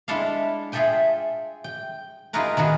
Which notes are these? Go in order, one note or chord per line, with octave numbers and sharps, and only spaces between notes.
G#3 D4 E4 A4 E5 F5
F4 G#4 A4 E5 G5 G#5
G5
D#4 F4 F#4 G#4 A#4 B4
D#3 B3 F#4 G#4